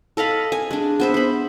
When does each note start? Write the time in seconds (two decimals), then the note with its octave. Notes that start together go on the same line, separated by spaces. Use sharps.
0.17 A4 D#5 F5 B5
0.52 G#5
0.71 G#3 D4
1.00 B3 C5 E5
1.14 C5 B5